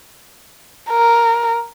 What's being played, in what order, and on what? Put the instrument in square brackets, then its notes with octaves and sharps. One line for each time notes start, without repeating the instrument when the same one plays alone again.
[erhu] A#4